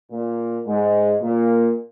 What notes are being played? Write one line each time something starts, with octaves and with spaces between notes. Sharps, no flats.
A#2 A#3
G#2 G#3
A#2 A#3